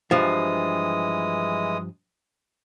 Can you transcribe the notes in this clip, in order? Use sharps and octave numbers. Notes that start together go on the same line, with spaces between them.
G2 E3 F3 G#3 D#6